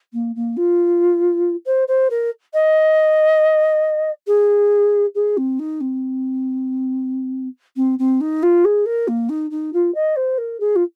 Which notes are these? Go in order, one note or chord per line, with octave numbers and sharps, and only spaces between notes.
A#3
A#3
F4
C5
C5
A#4
D#5
G#4
G#4
C4
D#4
C4
C4
C4
D#4
F4
G#4
A#4
A#3
D#4
D#4
F4
D#5
C5
A#4
G#4
F4